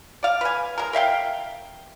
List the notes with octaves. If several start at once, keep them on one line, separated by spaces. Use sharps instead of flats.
D5 F5
B4 G#5
G#3 A#4
A#4 E5 F5 G5